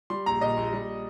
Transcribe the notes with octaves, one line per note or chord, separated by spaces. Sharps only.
G3 C6
A#1 A#5
A#2 D#5
A#1
G3